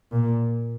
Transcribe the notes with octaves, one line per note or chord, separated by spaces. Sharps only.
A#2